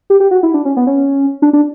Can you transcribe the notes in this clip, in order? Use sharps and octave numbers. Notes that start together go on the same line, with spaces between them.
G4
G4
F#4
E4
D4
C#4
B3
C#4
D4
D4